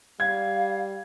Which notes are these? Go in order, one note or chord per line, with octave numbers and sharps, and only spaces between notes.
G3 F5 G#6